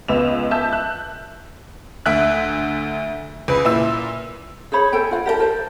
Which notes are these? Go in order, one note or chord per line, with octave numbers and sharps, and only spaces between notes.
C#2 B3 D#5 E6 E7 F7
E5 A5 E6 G6
F#6
D2 E5 F#6
C#2 B4
A#2 E4 E6
G#4 C5 C#5 B5
A4 C5 G5 G#5
F4 F#5
G4 A#4 D#5 A5
A4 A#4 C5